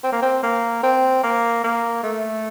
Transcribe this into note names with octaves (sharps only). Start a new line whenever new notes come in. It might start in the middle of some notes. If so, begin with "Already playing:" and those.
C4
A#3
C4
A#3
C4
A#3
A#3
A3